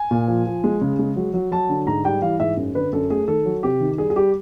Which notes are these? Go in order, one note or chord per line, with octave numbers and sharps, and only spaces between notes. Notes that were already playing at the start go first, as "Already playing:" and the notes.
Already playing: G#5
A#2
F3
F3
G#3
C#3
G#3
F#3
F#3
F#3 A5
D3
G#2 A#5
G3 G5
E3 F5
G#2 E5
F#2
D3 B4
F#2 A4
A3 G#4
D#3 A4
F#3
C3 G4
D#3
G3 G#4
G#4
G3 G4